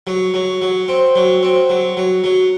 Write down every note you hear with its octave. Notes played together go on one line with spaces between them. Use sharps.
F#3
F#3
F#3
C4
F#3
C4
F#3
F#3
F#3